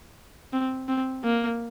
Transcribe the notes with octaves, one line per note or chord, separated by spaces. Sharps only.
C4
C4
A#3